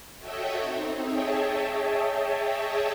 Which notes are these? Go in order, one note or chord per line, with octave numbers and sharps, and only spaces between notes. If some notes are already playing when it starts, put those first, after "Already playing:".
F#4 A4 C#5 D#5 E5 G5
C4 D#4
G#4 C#5 D#5 E5 G5 A5